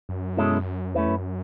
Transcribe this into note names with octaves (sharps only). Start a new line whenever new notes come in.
F#2
B2 G#3 C#4 E4 A4
E2 A3 C#4 E4 B4
F#2